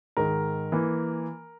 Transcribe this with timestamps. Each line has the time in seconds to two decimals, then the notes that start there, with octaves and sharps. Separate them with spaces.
0.17 G#2 D#3 G#3 A#4
0.72 E3 A#3